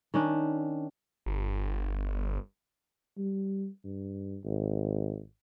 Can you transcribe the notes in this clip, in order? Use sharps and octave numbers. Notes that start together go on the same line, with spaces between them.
D#3 C#4 D4
G1
G3
G2
G#1